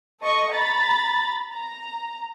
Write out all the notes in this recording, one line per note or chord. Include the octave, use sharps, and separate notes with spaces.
A4 D#5 C#6
A#5 B5 A6
A#5